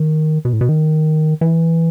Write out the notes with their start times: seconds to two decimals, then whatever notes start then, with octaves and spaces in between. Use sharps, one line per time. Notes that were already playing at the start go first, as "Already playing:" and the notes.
Already playing: D#3
0.45 B2
0.53 A2
0.61 B2
0.69 D#3
1.41 E3